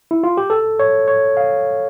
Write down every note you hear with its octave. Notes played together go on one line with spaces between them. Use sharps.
E4
F4
G4
A4
C#5
C#5
F5